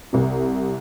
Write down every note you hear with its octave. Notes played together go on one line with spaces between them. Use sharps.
C2 C3